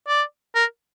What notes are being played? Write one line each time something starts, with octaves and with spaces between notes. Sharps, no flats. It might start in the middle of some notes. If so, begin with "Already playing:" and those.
D5
A#4